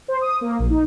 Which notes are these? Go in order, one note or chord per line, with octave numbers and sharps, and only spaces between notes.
C5
D#6
A#3
A#1
D#4